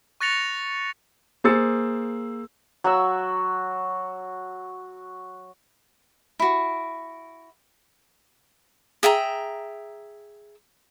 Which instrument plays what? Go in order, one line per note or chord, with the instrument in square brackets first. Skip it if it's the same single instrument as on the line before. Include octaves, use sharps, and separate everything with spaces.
[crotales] C#6 F#6 A6 A#6 C#7 F7
[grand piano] A#3 G#4 C5 E6 A6 C#7
[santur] F#3 F#4 E6
[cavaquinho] E4 F#4
G#4 E5 G5 A#5